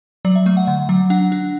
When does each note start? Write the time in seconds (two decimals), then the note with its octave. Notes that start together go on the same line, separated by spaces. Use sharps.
0.25 F#3 D5
0.36 E5
0.46 A3 E5
0.57 F#5
0.67 D3 F#5
0.89 F#3 F#5
1.10 D4 F#5
1.32 D4